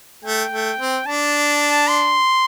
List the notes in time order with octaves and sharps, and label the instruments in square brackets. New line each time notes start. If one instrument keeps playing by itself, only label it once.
[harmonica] A3 [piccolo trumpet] G5
[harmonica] A3
C4
[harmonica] D4 [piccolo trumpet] A5
[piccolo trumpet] C6